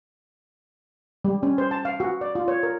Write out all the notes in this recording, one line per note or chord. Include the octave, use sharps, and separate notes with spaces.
G3
C#4
C5
A5
F5
F#4
D5
F4
C#5
A#4